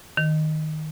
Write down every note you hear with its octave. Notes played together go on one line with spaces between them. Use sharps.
D#3